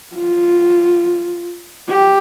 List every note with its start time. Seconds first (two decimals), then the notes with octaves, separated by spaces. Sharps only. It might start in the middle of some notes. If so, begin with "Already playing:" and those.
0.15 F4
1.89 G4